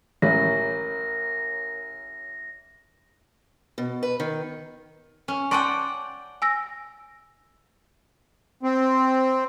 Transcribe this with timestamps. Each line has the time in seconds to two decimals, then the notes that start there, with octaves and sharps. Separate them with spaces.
0.22 A1 A#4 C#5 A#6
3.78 B2
4.03 B4
4.20 D#3
5.28 C#4
5.51 D5 F#5 G5 A5 C6 C#6
6.42 G#5 E6 A#6
8.63 C4